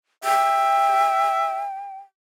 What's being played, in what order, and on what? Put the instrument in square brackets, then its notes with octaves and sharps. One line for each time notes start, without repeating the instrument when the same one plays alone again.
[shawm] E5 [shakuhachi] G5